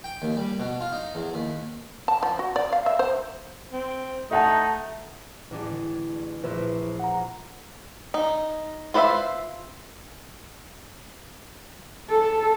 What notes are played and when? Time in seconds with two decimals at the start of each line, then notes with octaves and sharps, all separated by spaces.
0.04 G5
0.22 D#2
0.37 G3
0.60 B2
0.80 F4
0.92 D#4
1.15 E2
1.34 D#2
2.08 A5
2.23 F3
2.39 F#4
2.56 D5
2.72 F5
2.86 E5
2.99 C5
3.73 C4
4.31 A3 D#4 E5 F#5 A5
5.51 A1 D4 G#4
5.72 D3
6.43 A#1 E4 B4 C5 E5 C6
7.00 F#5 A#5
8.14 D#4
8.94 F4 B4 C5 D#5 E5
12.10 A4